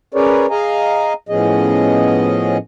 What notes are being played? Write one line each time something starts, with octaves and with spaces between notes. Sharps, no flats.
C#4 G#4 A#4 B4 C#5 D5
G#4 D#5 F5 G#5 A#5
A2 F3 B3 C#4 G#4 D#5